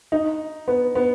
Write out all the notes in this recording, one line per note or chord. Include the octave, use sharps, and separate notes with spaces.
D#4
B3
B3